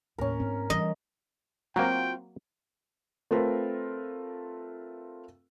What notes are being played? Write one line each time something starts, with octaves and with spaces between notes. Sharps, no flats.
D#2 A2 C#4 A#4
G#2 B3 C4
E3 G3 D#5
F#3 A#3 C4 F4 F#4 G5
A3 C4 F4 A#4 B4